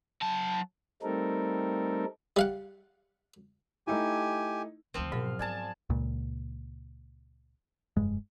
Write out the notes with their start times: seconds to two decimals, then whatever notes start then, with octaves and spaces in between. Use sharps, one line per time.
0.22 F#3 A5
1.03 G3 A3 C4 D#4 A4 A#4
2.36 G3 F5 F#5
3.87 A3 D#4 E4 G4 G#5
4.94 D2 C#3 F3 C4
5.12 G#2 B2 F#3 A#4 F5
5.39 B3 D5 G#5 A5
5.90 C#2 A#2
7.97 F1 G2 G#3